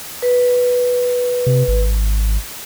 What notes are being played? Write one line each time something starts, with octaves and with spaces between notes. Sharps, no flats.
B4
C3
G#1